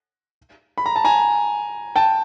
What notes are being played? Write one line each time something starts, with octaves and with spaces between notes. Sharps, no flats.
B5
A#5
A5
G#5 A#5
G5 A5